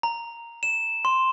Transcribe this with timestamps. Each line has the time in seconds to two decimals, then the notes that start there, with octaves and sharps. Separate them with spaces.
0.03 A#5
0.63 E7
1.05 C6